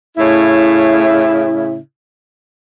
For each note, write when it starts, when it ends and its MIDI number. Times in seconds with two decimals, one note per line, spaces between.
0.18 1.76 45
0.18 1.76 49
0.18 1.76 64